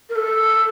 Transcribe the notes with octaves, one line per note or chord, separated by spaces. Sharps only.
A#4
A4